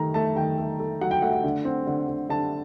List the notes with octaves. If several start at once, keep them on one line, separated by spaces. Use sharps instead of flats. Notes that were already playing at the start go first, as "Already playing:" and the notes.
Already playing: D#3 A3 A#5
A3 A5
D#3 G5
A3
A3
F#3 F#5
G5
A3 F#5
F#5
D3
C4
D3
D3
D3 A5